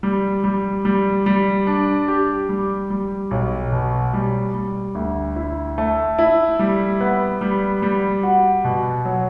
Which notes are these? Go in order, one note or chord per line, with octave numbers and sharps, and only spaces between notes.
G3
G3
G3
G3
D4
G4
G3
G3
B1
B2
G3
G3
D2
E4
A3
E4
G3
B3
G3
G3
F#4
B2
F#3